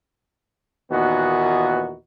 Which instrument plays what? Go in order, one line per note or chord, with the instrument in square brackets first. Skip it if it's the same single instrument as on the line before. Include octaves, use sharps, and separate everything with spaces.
[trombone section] D#2 A#2 E3 B3 D#4 F#4